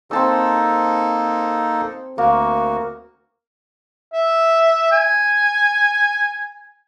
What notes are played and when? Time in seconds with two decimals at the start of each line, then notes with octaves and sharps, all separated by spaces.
0.11 A#3 C4 D#4 A4 A5 E6
2.18 D2 A#3 F#4
4.13 E5
4.92 G#5